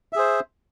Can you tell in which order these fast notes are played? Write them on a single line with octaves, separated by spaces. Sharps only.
E5 G#4 C5